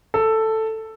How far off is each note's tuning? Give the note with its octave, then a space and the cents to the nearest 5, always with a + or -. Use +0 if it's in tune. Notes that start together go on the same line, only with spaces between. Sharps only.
A4 +5